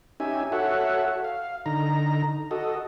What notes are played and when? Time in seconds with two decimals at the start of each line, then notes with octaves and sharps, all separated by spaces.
0.20 C#4 D#4 G4 E5 G#5
0.52 F#4 A4 C#5 E5 F#5
1.24 F5
1.66 D3 D#4 A#5
2.51 F#4 A4 D#5